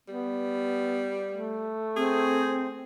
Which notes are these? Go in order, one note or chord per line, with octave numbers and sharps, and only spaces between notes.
G3 B3
A3
C4 G#4